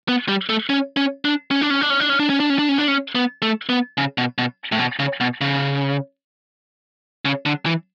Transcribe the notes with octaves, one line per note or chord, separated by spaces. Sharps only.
B3
G3
A3
C#4
C#4
D4
C#4
D4
C#4
D4
C#4
D4
C#4
D4
C#4
D4
C#4
D4
C#4
D4
C#4
B3
A3
B3
C#3
B2
B2
A2
B2
C#3
B2
C#3
C#3
D3
E3